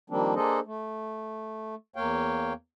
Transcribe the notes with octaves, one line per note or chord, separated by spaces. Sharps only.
D#3 F3 G3 A#3 C4 D4
A#3 D4 G#4 A4 C5 D#5
A3
E2 A#3 C#5 F5 G5